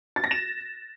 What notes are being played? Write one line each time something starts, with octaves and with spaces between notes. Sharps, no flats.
A6
A#6
E7